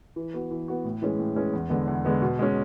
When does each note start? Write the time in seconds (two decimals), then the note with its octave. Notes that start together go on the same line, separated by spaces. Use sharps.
0.16 E3
0.34 B3 F#4
0.51 E3
0.68 B3 F#4
0.84 A2
1.02 E3 G#3 C#4 G#4
1.19 A2
1.36 E3 G#3 C#4 G#4
1.53 E2
1.70 D3 G#3 B3
1.88 E2
2.05 D3 G#3 B3
2.22 B2
2.39 G#3 C#4